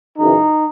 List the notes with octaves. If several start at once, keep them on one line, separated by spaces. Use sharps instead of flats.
F#2 C#3 E3 D#4